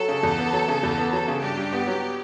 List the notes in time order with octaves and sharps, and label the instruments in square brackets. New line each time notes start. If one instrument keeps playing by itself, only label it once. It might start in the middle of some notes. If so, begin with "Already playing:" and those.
Already playing: [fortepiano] F#3 [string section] A4
[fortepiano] C#3
E2
B3
F#3
C#3
E2
B3
[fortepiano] F#3 [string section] A4
[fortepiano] C#3
[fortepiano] G2 [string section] G4
[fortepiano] G2
B3
F#3